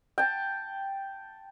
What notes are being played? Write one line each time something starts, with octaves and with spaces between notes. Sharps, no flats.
G5 A5